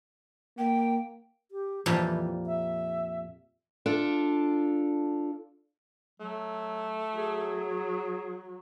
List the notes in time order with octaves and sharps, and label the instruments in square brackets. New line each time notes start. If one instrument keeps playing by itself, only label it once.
[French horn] A#3 [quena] G5
[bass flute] G4
[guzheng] F2 A#2 G3 [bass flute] E3
[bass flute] E5
[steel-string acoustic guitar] D4 F4 A4
[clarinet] F#3 [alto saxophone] A3
[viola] F#3 [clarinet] G#4